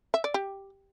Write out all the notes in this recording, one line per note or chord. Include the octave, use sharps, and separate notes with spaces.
E5
D5
G4